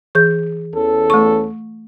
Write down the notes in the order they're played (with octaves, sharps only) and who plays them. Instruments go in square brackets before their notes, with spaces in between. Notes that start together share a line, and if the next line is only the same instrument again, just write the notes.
[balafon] E3 [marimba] G#4 G6
[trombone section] E2 C#4 A4
[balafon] A3 C#6